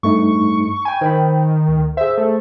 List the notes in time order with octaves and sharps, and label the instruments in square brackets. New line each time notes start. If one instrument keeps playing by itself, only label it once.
[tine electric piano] G2 A3 D#4 [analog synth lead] C#6
[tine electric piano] G5 B5 [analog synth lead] G#5
[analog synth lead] D#3 [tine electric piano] C5 G5 B5
[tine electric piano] D2
[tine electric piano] G#4 C5 [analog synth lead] E5
[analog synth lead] A3